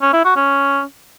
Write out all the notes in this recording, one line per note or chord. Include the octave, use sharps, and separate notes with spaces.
C#4
E4
F#4
C#4